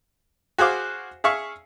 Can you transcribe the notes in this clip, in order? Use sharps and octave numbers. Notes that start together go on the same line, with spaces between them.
F#4 G#4 C5 F5 D6
G#4 E5 F5 C#6